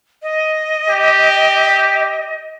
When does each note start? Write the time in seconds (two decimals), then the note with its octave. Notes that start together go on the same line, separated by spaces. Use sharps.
0.22 D#5
0.90 G4